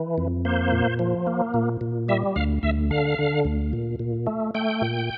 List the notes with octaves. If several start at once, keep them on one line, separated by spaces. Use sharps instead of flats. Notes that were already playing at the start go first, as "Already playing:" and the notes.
Already playing: E3
F2
A#3 C5
A#2
F3
A#3
A#2
A#2
G3 E5
D2 F5
D2 E5
D3 F5
D3
D2
A#2
A#2
A3
A3 G5
A#2